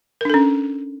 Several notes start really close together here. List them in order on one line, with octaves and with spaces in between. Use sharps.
A#4 D4 A4 C#4